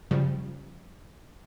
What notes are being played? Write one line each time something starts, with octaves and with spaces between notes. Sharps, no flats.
F#2 C#3 F3 G3